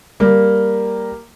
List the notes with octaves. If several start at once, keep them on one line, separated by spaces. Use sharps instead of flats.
G3 A#3